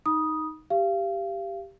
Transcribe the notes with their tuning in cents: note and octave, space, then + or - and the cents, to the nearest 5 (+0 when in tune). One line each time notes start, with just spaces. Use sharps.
D#4 +0 B5 -35 D#6 +0
G4 +0 F5 -30